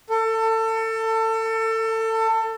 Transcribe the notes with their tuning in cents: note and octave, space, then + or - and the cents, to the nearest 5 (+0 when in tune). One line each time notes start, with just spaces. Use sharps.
A4 +30